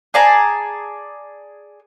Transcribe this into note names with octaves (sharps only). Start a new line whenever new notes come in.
G#4 D5 A5 A#5